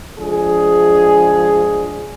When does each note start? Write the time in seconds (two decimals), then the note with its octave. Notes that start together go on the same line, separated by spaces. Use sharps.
0.19 F3 G#3 D4 G#4